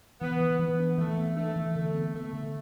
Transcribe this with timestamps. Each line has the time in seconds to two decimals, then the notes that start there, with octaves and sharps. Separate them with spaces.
0.21 E3 B3
0.40 E3
0.59 E3 B3
0.79 D4
0.98 E3 A3
1.17 B3
1.36 A3 D4
1.56 E3
1.75 D3 A3
1.94 B3
2.14 A3 B3
2.33 D3